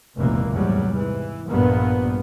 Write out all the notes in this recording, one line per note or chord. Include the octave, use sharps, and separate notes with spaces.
F1 C#2 F#2 A#2 E3 A#3
E2 G#2 C3 F#3 G3
E3
A#1 G2 A#2 A#3 B3